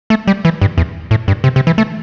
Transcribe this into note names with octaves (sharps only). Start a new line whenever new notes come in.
A3
G3
E3
G2
E2
A2
G2
C3
C3
E3
A3